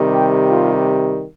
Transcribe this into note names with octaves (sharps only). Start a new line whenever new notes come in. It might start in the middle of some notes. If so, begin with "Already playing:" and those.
Already playing: C3 D#3 G3
G4
F4